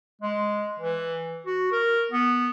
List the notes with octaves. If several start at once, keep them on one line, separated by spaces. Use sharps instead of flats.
G#3
E3
F#4
A#4
B3